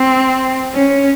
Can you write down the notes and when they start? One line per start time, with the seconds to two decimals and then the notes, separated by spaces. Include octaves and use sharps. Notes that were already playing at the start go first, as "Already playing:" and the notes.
Already playing: C4
0.74 C#4